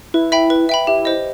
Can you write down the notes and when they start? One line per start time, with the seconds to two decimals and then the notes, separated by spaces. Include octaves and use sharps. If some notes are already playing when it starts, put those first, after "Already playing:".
0.14 E4 B4
0.32 E5 G5 B5
0.50 B4
0.69 E5 G5 B5
0.87 E4 G4
1.05 C5 D#5